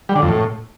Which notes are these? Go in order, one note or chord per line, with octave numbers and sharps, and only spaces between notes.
G3
D3
F2
A2